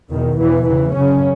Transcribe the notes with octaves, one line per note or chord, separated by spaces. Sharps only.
E2 B2 D#3
E2 B2 E3
E2 C#3 E3
F#2 C#3 C#4